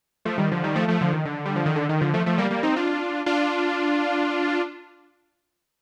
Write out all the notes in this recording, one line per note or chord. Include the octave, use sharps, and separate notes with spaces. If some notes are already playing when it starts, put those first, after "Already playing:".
F3 A3
D#3 G3
D3 F3
D#3 G3
F3 A3
F3 A3
D3 F3
D#3
D3
G3
F3
D#3
D3
D#3
D3 F3
F3 A3
F3 A3
G3 A#3
G3 A#3
C4 D#4
D4 F4
D4 F4